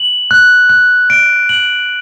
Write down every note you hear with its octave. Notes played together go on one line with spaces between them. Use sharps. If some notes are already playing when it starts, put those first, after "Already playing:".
Already playing: F#7
F#6
F#6
D7
F#7